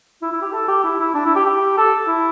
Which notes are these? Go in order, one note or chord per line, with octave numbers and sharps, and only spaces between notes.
E4
E4
G4
A4
G4
E4
E4
D4
E4
G4
G4
A4
E4